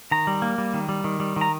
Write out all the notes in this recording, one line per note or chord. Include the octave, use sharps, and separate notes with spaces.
D#3 A#5
G3
A#3
G3
D#3
G3
D#3
G3
D#3 A#5